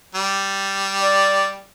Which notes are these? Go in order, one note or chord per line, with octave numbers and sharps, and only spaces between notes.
G3
D5